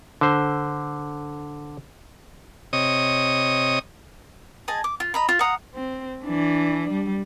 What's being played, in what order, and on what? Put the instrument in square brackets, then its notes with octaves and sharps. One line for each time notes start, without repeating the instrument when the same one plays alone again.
[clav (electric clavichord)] D3 C5
[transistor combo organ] C3 C#5 D#5 D#6
[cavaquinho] G#4 D#5 G#5 A5
D6
F4
D#5 A#5 B5
F4
F5 F#5 A#5 D#6
[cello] C4
E3 D4
G3